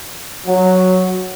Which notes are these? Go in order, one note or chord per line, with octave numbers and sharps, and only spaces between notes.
F#3